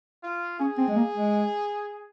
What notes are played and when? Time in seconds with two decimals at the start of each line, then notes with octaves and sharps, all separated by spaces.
0.23 F4
0.60 C#4 G#4
0.78 C4
0.88 G#3
0.96 A#3
1.14 G#3